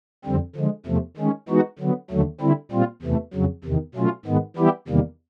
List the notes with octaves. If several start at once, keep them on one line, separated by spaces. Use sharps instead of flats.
F2 D3 G3 C4
D3 F3 G#3
E2 C3 F3 A3
D#3 G#3 C#4
E3 G#3 B3 D#4 F#4
D3 F#3 B3
D#2 D3 F#3 A3
D3 G3 C4 E4
A#2 G3 C4 F4
E2 C3 E3 A3
F2 C#3 F#3
E2 C3 D#3
B2 F#3 A3 C#4 F4
G#2 D#3 G#3 B3
E3 G3 B3 E4 G4
E2 C3 D#3 G3 A#3